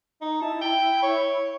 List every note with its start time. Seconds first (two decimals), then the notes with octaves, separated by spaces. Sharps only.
0.21 D#4
0.42 E4 A5
0.61 G5
1.03 C#5